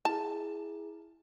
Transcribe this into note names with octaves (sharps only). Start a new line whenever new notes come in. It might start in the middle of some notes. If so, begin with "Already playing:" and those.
E4 G#4 A5